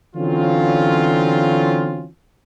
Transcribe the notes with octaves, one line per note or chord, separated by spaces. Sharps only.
D3 E3 F#3 C4 C#4 F4